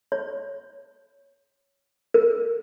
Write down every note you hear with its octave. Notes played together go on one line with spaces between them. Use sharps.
C#5
A#4